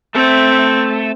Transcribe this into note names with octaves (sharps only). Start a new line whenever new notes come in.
A3 C4 A4